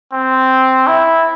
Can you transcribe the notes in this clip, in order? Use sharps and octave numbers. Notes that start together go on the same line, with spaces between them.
C4
E4